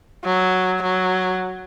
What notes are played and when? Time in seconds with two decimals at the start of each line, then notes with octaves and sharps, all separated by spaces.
0.25 F#3
0.82 F#3